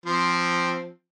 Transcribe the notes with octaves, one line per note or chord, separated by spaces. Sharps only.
F3 C4 C5